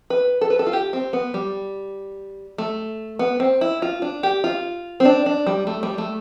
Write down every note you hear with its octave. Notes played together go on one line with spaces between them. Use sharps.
B4
A4
B4
A4
F4
G4
C4
B3
G3
A3
B3
C4
E4
F4
D4
G4
F4
C4
D4
D4
G3
A3
G3
A3